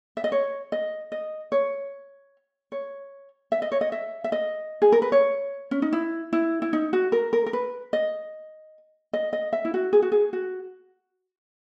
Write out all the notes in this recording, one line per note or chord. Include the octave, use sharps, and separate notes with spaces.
E5
D#5
C#5
D#5
D#5
C#5
C#5
E5
D#5
C#5
D#5
E5
E5
D#5
G#4
A#4
B4
C#5
C#4
D#4
E4
E4
E4
D#4
F#4
A#4
A#4
A#4
B4
D#5
D#5
D#5
E5
E4
F#4
G#4
F#4
G#4
F#4